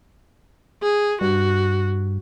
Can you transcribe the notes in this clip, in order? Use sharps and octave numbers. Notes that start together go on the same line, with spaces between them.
G#4
G2 F#4